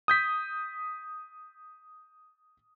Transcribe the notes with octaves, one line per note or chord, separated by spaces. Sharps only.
D#6 G6 B6